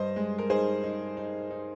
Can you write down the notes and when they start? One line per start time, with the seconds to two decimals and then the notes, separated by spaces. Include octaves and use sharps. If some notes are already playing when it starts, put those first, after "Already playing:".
Already playing: G2 C5 D#5
0.16 G#3
0.38 A#4
0.50 D#4 G#4 C5
0.84 D#4
1.17 D#4
1.51 D#4